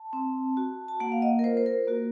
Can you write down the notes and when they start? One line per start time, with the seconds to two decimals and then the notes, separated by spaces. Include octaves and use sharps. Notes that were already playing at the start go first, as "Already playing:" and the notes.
Already playing: A5
0.13 C4
0.57 F#4
0.88 A5
1.00 A#3 F#5
1.12 F5
1.22 D#5
1.39 A#4
1.44 F4 C5
1.57 C5
1.66 A#4
1.87 A#3 F#4